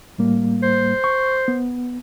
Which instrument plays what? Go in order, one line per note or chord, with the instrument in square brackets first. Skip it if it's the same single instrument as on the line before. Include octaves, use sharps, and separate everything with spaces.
[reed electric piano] A2 G3 A#3
[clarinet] C5
[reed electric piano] C#6
B3